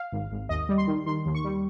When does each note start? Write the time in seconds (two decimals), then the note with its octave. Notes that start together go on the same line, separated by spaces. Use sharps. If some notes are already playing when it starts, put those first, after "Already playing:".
Already playing: F5
0.12 G#1
0.32 G#1
0.49 D#2 D#5
0.69 G3
0.78 C6
0.87 D#3
1.06 D#3 C6
1.26 D#2
1.35 C#6
1.44 G3